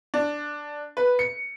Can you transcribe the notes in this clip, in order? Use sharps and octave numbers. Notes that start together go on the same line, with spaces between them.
D4
B4
C#7